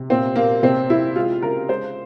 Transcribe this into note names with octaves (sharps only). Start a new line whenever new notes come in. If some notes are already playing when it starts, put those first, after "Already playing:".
Already playing: C3
A#2 C4
A#2 A#3
C3 C4
C3 E4
G#3 F4
C#3 A#4
G#3 C5